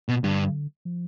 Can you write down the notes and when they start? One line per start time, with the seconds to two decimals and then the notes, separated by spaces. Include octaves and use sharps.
0.09 B2
0.24 G2 D3
0.85 F3